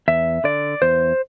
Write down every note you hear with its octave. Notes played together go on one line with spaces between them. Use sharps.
E2 E5
D3 D5
E2 C5